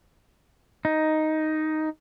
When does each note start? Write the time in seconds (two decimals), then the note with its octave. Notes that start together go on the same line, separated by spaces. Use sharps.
0.85 D#4